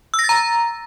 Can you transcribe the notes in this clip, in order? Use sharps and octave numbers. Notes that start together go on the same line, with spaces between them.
E6
A#6
A6
A#5